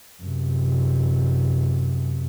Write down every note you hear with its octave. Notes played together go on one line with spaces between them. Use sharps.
F#2 C3